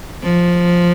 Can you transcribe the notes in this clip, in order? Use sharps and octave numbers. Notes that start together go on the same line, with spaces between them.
F3